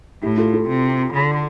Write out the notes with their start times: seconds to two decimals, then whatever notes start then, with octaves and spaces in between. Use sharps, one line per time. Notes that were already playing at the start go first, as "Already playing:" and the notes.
0.22 A2 E4 G4
0.37 F4 A4
0.54 F4 A4
0.68 C3
1.14 D3